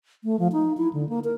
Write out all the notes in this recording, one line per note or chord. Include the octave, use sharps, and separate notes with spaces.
A3
F3
D#4
E4
D3
A#3
A#4